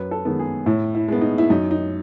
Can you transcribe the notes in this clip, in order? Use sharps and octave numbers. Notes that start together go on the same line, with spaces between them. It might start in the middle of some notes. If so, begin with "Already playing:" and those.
Already playing: F#2 B4
A4
D#3 G#3 B3
G#4
A2 E4
E4
G#3 B3
D#4
E4
F#2 D#4
D#4